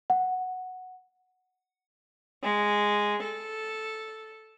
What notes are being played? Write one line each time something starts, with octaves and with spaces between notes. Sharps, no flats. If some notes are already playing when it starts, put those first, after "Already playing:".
F#5
G#3
A4